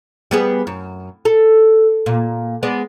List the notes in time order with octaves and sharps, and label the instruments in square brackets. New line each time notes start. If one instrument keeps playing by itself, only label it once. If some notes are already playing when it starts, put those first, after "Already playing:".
[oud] G3 B3 G#4
F#2
A4
A#2
G#3 B3 D5